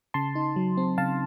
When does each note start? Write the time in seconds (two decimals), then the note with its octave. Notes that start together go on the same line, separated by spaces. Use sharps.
0.14 C#3 A5 C6
0.35 D#4
0.56 F#3
0.77 C4
0.98 C#3 F5 A5